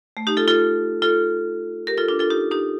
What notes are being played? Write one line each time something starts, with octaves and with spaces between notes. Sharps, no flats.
A3
D#4 G4
F4 A4
F4 A4
F4 A4
G4 A#4
F4 A4
D4 F4
F4 A4
D#4 G4
D#4 G4